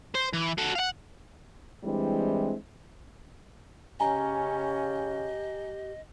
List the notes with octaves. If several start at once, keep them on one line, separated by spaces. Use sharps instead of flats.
C5
E3
F#4 A4
F5 F#5
E3 G3 G#3 C4 D4 E4
C#3 C#4 G4 D#5 G#5 A#5